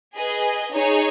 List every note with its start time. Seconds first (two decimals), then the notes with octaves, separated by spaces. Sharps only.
0.16 G#4 B4 D#5 G#5
0.73 D#4 G#4 C#5